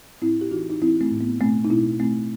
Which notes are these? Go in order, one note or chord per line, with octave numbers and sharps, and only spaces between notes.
A2 C4 E4
G4
E3 D#4 F#4
D#4
E3 C4 E4
A3 C4
A2
B3
B2 A3 C4
D#4
B2 C4 E4
B2 A3 C4